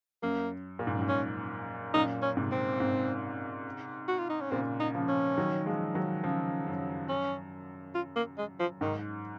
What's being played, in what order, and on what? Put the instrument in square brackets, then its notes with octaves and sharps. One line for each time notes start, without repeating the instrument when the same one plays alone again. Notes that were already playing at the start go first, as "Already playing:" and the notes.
[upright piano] F#2 [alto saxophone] A#3
[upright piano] A#2
G#2
F#2
G#2
[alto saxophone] C#4
[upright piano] F#2 A#2 [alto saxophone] D#4
[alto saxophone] C#4
[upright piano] G#2 C3
[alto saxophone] C4
[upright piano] G#2 C3
[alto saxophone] F#4
F4
D#4
C#4
[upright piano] A#2 C#3 [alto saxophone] C4
[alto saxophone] D#4
[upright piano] C#3 F3
[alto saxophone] C#4
[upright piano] D#3 F#3
F3 G#3
D#3 F#3
C#3 F3
F#2
[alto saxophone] C#4
F4
A#3
G#3
F3
[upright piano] G#2 [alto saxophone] D#3